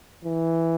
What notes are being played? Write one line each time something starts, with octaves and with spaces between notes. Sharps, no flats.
E3